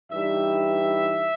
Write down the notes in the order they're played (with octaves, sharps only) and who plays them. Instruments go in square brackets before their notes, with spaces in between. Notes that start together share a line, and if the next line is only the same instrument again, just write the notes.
[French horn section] G2 E3 G3 D#4 G4 [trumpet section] E5